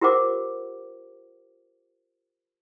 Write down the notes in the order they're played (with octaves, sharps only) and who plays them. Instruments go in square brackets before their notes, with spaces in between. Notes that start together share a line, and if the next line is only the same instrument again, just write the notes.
[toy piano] F4 G4 A#4 C5 F#5 D6